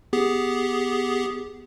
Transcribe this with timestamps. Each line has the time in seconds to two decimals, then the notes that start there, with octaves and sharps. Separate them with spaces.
0.13 B3 G4 G#4